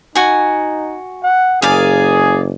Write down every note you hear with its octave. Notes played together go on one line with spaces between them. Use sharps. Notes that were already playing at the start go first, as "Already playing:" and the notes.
D#4 F#4 G#5
F#5
F#1 G#4 A#4 D5 F5